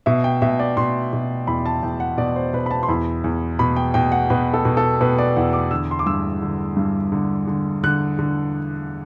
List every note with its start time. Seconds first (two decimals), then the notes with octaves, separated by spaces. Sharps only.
0.06 B2 E5
0.24 G5
0.42 B2 E5
0.60 D5
0.77 B2 C6
1.13 B2
1.47 E2 B5
1.66 A5
1.83 E2 G5
2.00 F#5
2.18 B2 D5
2.36 C5
2.53 B2 B4
2.66 B5
2.71 A5
2.83 C6
2.88 E2 B5
3.24 E2
3.59 B2 B5
3.76 G5
3.94 B2 G5
4.12 F#5
4.30 B2 B4
4.54 A4
4.65 B2
4.77 A4
5.01 B2 B4
5.19 D5
5.36 E2 F#5
5.53 D6
5.71 D3 E6
5.91 C6
5.99 D6
6.06 G2 E6
6.42 D3
6.77 G2
7.12 D3
7.47 D3
7.83 D3 F#6
8.19 D3